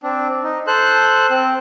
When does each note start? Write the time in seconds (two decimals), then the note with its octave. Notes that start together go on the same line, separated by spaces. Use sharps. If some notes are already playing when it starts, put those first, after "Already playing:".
0.03 C4 D4
0.43 D#4
0.67 A4 C5 F#6
1.31 C4